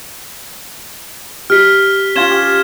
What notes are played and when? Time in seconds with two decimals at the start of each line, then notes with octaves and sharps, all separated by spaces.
1.50 G4 F6 B6
2.15 C#4 F4 G#6 E7 G7
2.30 G4